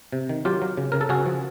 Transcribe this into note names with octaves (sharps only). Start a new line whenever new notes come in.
C3
D#3
F#3 F4 G4
F#3
C#3
C#3 A#4
A4
C#3 F#4 G#4
F3